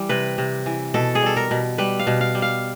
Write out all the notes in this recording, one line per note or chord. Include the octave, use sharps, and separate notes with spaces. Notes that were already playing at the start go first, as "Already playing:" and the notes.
Already playing: E3 G3
C3 B4
C3
E3
B2 A4
G#4
G3 A4
A#4
B2
G3 B4
F5
B2
F5
G3
F5